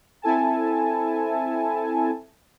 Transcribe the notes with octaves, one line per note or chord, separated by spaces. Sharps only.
C4 E4 A4 G#5 A5